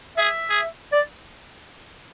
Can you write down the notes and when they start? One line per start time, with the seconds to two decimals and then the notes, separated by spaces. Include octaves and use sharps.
0.17 G#4 E5
0.50 G#4
0.92 D5